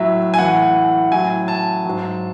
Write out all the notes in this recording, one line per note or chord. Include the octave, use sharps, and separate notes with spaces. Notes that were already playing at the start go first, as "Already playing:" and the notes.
Already playing: A2 F#3 E5
G#5
A2 E3 F#5
A2 F#3 G#5
A5
G#2 F#3